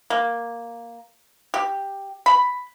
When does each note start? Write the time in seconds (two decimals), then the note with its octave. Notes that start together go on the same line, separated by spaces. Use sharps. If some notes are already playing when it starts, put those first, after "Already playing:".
0.10 A#3
1.54 G4
2.26 B5